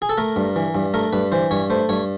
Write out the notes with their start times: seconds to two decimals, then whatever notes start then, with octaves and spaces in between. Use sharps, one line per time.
0.02 G#4
0.09 A4
0.18 A3 A#4
0.36 G2
0.56 E3
0.75 G2
0.94 A3 A#4
1.13 G2 B4
1.32 E3 C5
1.51 G2 C#5
1.70 A3 C5
1.89 G2 C#5